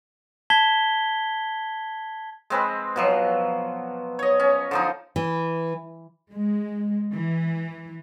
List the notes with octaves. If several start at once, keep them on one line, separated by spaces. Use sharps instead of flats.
A5 G#6 B6 G7
G#3 C4 B4
B2 F3 F#3
C#5 D#5
C#4
D3 F3 D#4
E3
G#3
E3